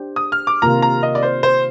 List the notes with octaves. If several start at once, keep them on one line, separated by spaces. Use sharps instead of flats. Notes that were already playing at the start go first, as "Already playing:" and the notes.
Already playing: D4 G4 C5
D#6
F6
D6
C3 D#3 A#3 F4 A#5
A#5
D#5
D5
C5
C5